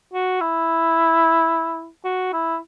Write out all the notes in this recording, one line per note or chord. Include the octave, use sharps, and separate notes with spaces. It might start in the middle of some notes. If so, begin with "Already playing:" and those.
F#4
E4
F#4
E4